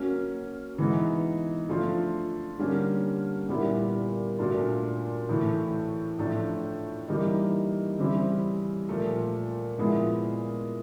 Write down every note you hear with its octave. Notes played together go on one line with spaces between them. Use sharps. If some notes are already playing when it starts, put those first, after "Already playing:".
Already playing: F#3 A#3 C#4
E3 G#3 B3 D#4
F3 A3 D4 F4
D3 G3 A#3 C#4
A#2 G3 B3 E4
A#2 F#3 A3 D4 F4
A2 E3 A3
A2 F3 A3 D4
E3 G3 A#3 D#4
C#3 E3 G3 C4 E4
A#2 F3 A3
A#2 F3 G#3 B3 E4